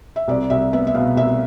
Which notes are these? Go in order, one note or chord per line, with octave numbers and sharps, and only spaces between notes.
E5
C2 D5
C2 E5
B3 E5
E5
B2 F5
C2 E5